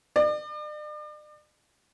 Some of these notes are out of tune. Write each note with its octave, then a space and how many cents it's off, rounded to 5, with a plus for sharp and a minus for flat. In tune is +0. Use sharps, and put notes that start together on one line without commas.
D5 +40